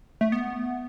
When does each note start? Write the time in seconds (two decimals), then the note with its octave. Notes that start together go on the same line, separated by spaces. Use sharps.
0.21 A3
0.32 B3